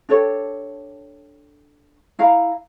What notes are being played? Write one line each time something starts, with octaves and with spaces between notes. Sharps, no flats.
D4 G4 A4 C#5
E4 F5 A#5